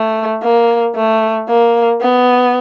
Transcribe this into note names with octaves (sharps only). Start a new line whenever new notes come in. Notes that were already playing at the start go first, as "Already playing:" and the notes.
Already playing: A3
A#3
A3
A#3
B3